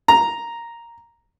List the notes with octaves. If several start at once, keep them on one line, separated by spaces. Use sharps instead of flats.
A#5